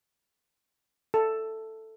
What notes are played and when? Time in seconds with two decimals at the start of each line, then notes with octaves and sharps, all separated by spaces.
1.14 A4